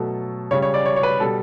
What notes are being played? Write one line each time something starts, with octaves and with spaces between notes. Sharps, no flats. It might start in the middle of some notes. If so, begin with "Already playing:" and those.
Already playing: B2 F#3 A3 A4
C#3 G3 C#5
C#5
D5
C#5
C#5
B4
B2 G3 A4